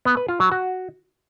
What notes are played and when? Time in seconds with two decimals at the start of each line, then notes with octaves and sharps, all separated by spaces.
0.05 B3
0.17 B4
0.29 F4
0.40 F#3
0.52 F#4